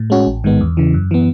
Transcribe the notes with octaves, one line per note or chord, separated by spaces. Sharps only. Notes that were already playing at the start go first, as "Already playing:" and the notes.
Already playing: A2
G#3 C#4 F#4
A1
G#2 D#3 G#3 B3
E2
C#3 E3
F#2
E3 B3